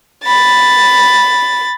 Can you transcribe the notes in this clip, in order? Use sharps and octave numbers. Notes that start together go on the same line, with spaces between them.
B5 A6